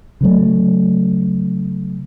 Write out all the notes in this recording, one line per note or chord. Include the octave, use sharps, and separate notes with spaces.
C#3 F#3 A3